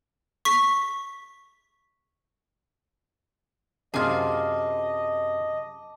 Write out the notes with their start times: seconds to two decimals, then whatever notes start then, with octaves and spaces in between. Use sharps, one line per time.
0.45 C#6 B6
3.94 F#2 C3 F4 G#4 D#5 A5 D6